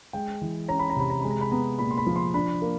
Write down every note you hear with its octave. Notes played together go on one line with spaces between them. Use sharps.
G#3 G5
E3
C#4 A#5
B5
A#5
C3 B5
A#5
G#3 B5
A#5
B5
B3 A#5
A#2 B5
C6
B5
F3
C6
D4 B5
A#3